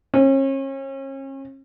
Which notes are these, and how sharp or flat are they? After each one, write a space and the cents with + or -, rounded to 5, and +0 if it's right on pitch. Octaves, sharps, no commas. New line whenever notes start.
C#4 -40